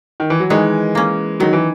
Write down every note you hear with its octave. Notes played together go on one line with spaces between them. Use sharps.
D#3
E3
F#3
D#3 E3 G#3
A#3 C#4
D#3 F#3
E3